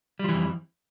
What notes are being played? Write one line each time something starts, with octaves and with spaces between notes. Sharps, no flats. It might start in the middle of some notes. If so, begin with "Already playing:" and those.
F2 E3 F3 G3